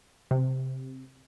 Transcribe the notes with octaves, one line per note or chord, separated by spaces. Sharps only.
C3